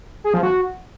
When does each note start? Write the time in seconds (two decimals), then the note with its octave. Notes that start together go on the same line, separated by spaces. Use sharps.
0.24 G#4
0.34 F3
0.43 F#4